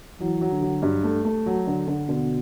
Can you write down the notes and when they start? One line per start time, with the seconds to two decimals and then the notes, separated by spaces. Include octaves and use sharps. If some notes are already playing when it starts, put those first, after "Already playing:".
0.20 E3 F#3
0.41 F#3
0.52 D3
0.62 F#3
0.82 G2
1.04 A3
1.25 A3
1.46 F#3
1.67 D3
1.87 D3
2.09 B2 D3